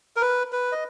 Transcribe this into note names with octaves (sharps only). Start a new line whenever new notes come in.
A#4
B4
B4
D#5